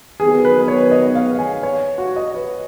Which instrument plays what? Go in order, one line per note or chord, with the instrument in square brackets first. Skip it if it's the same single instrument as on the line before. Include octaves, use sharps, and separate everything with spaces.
[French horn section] D#3 F#3 B3 [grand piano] G#4
[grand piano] B4
C#5
D#5
F5
G#5
C#5
F#4
D#5
B4